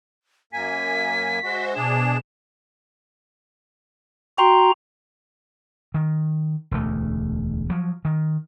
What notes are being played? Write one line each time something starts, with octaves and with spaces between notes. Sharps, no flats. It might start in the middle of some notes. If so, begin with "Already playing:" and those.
F#2 A#3 G#5 B6
G#3 F#4 C5 E5
B2 D4 G#4 E7
F#4 G5 A#5 C6
D#3
E1 D2 A3
F3 F#3
D#3